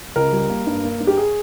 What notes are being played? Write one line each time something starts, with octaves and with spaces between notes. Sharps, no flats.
C#2 A#4
G3
A#3
G2
A#3
G2
G4
G#4